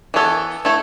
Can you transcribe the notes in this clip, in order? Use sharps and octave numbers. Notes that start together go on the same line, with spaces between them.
E3 B3 A4 C#5
A3 E4 A4 C#5